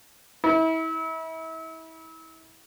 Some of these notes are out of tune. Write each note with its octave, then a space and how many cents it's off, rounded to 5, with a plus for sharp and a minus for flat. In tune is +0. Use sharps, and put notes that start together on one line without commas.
E4 -35